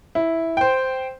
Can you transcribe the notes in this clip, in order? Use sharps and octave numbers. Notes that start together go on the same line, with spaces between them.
E4
C5 G5